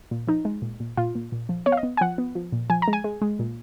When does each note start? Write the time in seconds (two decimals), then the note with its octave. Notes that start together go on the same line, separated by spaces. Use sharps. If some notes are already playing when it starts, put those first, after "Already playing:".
0.11 A#2
0.27 F3 D#4
0.45 G#3
0.62 A#2
0.80 A#2
0.97 A#2 F4
1.15 A#2
1.32 A#2
1.49 F3
1.66 B3 C#5
1.72 F5
1.77 D#5
1.83 B3
1.97 G#5
2.01 F3 F#5
2.18 B3
2.35 F3
2.52 A#2
2.70 F3 G#5
2.82 A#5
2.88 G#3
2.93 G#5
3.04 G#3
3.22 G#3
3.39 A#2